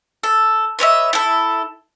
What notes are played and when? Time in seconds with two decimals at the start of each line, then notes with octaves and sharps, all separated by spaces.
0.23 A4
0.79 B4 C#5 D#5 E5
1.13 E4 A4